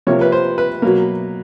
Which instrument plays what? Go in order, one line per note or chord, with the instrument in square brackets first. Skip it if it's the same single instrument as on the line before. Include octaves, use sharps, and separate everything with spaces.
[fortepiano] C3 F3 A#3 C#5
B4
C5
B4
B2 F#3 A#3